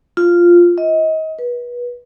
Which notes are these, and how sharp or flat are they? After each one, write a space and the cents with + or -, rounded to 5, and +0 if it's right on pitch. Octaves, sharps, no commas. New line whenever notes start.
F4 -5
D#5 +30
B4 -30